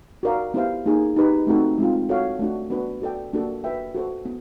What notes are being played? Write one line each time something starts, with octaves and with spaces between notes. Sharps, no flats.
F#4 A#4 D5 F5
B3 E4 G4 C5 F5
A#3 D#4 G#4
D#4 G4 B4
A3 C4 D#4 F#4 A4
G#3 C4 F4
F#4 A4 C#5 F5
A3 D4 F#4
B3 D4 F#4 B4
F#4 A4 D5 G5
A#3 D4 F#4 A4
F#4 B4 E5 G5
F#4 A4 C5
B3